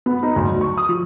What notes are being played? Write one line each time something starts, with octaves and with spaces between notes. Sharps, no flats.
B3
D#4
D2
F#3
C#6
D#6
F3